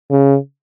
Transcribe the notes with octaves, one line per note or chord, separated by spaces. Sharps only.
C#3